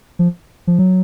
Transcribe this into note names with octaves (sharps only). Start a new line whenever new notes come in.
F3
F3
F#3